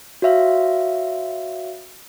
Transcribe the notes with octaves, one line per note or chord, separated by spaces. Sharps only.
F#4 C#5 E5 F5